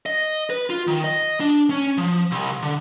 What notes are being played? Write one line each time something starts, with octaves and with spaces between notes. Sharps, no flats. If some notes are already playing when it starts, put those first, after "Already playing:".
D#5
B4
F4
D#3
D#5
D4
C#4
F3
C2
D3